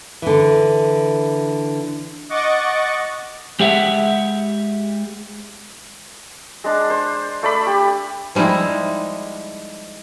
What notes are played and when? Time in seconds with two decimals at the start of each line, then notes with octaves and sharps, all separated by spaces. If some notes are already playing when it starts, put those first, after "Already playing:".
0.22 D3 E3
2.29 D#5 F#5 C#6 D6 A6
3.60 G#3 G4 E5 F#5
6.64 G#3 D4
6.90 C5
7.43 A3 D5 B5
7.67 G4
8.35 F3 G3 G#3 D#4 E4